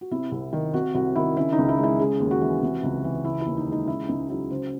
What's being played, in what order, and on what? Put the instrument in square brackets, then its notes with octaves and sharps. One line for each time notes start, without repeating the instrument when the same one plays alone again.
[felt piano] F#4
C3 E4
C2
D#3
C3 F#4
C2 F#4
D#3 E4
C#3 E4
D#4
C#2
E4
G#3
E4
C#3 G#4
D#2
F#4
E3
C3
C#2
E3
C#3 E4
D#2 E4
D#4
G#3
D#4
C#3 E4
C#2 D#4
F#3 E4
C#3 C5